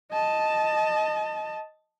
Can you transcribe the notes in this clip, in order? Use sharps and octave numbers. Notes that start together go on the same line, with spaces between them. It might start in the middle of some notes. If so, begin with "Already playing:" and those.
D#5 A5